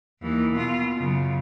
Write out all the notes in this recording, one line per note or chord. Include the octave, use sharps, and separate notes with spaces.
D#2 E3
B2 F4
F#2 C#3